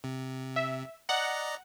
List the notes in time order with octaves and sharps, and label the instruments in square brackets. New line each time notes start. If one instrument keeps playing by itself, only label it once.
[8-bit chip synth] C3
[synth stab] E5
[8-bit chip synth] D5 D#5 A#5 [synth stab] F#5